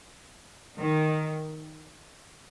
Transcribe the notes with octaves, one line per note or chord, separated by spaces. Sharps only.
D#3